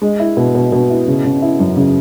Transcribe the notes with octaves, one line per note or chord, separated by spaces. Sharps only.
G#3
E4
B2
B2
B2
E4
C#3
C#3
E4
F#2
C#3